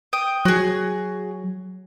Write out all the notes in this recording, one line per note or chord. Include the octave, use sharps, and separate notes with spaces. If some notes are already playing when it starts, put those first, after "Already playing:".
G5 D#6
F#3 F#4 G#4